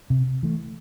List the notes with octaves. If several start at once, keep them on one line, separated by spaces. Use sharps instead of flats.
C3
E3 A3